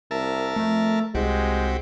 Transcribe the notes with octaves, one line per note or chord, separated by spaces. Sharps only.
C2 A#4 E5 A5
F2 A3
C2 G#3 C4 F#4 G4